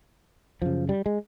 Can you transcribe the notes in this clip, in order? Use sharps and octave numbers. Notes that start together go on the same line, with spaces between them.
F#2 C#3 F3
G3
G#3